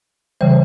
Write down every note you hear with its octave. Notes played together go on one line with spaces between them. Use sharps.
C#3 E3 G3 C5